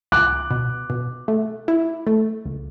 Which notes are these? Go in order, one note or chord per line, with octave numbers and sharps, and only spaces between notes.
C#2 D6 F#6
B2
B2
A3
E4
A3
C#2